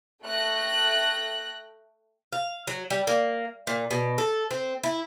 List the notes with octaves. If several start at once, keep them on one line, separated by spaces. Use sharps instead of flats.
A3 G5 F#6 A#6
F5
F#3
G3
A#3
A#2
B2
A4
C4
E4